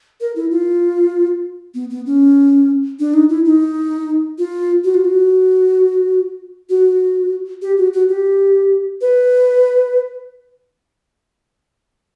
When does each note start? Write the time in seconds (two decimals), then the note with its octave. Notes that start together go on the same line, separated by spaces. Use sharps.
0.21 A#4
0.36 E4
0.51 F4
1.75 B3
1.90 B3
2.06 C#4
2.99 D4
3.14 D#4
3.29 E4
3.45 D#4
4.38 F4
4.84 F#4
4.94 F4
5.05 F#4
6.70 F#4
7.62 G4
7.77 F#4
7.93 F#4
8.09 G4
9.01 B4